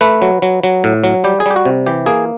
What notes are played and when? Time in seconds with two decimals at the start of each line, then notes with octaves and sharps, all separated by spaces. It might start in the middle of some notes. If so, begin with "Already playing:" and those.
0.01 A3 B4
0.22 F#3
0.42 F#3
0.64 F#3
0.84 A2
1.04 F#3
1.24 G3 G4
1.40 G#4
1.46 G3 G4
1.56 F#4
1.65 C3
1.86 E3 G4
2.06 A#3 G#4